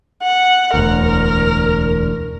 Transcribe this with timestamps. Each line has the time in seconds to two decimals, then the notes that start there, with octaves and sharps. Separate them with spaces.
0.23 F#5
0.74 E1 D2 A#4